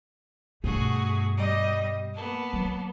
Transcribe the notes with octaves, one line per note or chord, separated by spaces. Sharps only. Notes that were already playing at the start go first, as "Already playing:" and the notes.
G2 B2 A3 F#4 G#4
G3 D#5
A#3 B3 A5
F#3